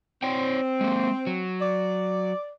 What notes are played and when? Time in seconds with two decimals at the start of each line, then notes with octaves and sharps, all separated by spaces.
0.23 C4 C#5 D5 G5
0.81 G#3 A#3
1.27 F#3
1.61 D5